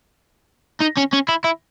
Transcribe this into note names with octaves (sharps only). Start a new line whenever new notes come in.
D#4
C#4
C#4
E4
E4